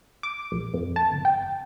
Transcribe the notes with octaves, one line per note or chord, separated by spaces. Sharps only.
D6
A#1
F2
A5
G1
G5